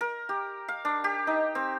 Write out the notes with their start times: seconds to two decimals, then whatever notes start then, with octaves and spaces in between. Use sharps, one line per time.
0.01 A#4
0.29 G4
0.68 F5
0.85 D4
1.04 G4
1.27 D#4
1.55 C4